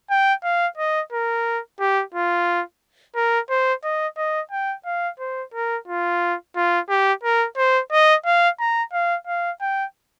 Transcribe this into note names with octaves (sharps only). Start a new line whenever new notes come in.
G5
F5
D#5
A#4
G4
F4
A#4
C5
D#5
D#5
G5
F5
C5
A#4
F4
F4
G4
A#4
C5
D#5
F5
A#5
F5
F5
G5